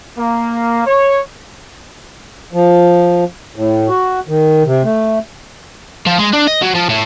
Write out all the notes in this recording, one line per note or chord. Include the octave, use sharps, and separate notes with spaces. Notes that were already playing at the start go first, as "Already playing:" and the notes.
A#3
C#5
F3
A2
F#4
D#3
C3
A3
F3
G#3
D4
D#5
F#3
F3
A2